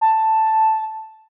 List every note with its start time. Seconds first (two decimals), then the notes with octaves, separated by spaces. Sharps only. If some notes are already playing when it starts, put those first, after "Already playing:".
0.01 A5